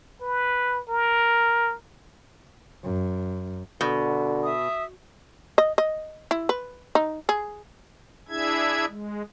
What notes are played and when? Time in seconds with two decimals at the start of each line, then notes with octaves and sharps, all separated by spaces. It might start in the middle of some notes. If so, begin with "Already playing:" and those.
0.22 B4
0.89 A#4
2.84 F#2
3.81 B2 D3
4.44 E5 D#6
5.58 D#5
5.78 D#5
6.31 E4
6.49 B4
6.95 D#4
7.29 G#4
8.29 D4 E4 G#4 E5 G#6
8.87 G#3